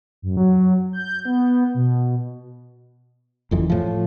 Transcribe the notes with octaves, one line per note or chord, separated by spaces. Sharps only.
F#2
F#3
G6
B3
B2
F#1 F2 E3
A2 F3